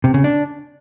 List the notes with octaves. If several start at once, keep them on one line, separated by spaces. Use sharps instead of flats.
C3
C#3
D4